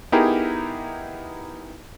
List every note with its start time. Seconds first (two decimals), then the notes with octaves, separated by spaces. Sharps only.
0.12 B3 D#4 E4 G4 G#4 A#4